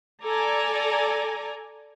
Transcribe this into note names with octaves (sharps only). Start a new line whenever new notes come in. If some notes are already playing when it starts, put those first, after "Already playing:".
A4 D5 G#5 A#5